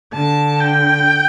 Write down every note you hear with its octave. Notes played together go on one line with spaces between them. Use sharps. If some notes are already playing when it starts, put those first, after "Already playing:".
D3 A5
G5